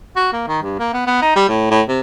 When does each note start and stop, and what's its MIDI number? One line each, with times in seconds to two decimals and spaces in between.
0.16 0.30 66
0.33 0.47 58
0.48 0.60 51
0.62 0.76 43
0.80 0.90 58
0.93 1.03 59
1.07 1.20 59
1.22 1.33 63
1.36 1.44 55
1.48 1.67 45
1.71 1.83 45
1.88 2.01 48